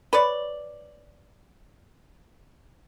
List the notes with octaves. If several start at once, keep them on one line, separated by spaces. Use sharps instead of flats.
B4 C#5 D5